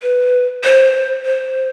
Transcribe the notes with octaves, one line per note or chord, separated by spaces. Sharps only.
B4
C5
C5